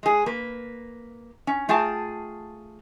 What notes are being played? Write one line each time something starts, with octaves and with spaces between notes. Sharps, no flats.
G#3 G#4
A#3 B4
C#4
A3 F4 G#4 G5 A5